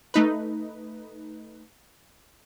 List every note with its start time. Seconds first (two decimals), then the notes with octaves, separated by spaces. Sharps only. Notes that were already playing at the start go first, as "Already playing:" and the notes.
0.14 A3 D#4 B4